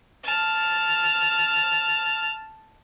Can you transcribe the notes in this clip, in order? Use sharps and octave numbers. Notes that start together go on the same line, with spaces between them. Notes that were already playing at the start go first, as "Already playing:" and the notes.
A5 F6